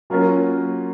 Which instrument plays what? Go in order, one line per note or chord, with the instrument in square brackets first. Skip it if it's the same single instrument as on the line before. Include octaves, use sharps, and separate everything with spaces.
[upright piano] F#3 A#3 C#4 F4 A#4